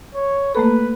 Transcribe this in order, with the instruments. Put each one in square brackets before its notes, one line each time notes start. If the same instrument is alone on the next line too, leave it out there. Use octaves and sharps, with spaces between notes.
[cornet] C#5
[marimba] A3 A#3 A4 [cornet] B4